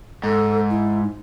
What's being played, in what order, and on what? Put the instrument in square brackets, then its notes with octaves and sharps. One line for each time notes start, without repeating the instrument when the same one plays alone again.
[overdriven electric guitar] G#2 [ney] A4
[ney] E4
D#4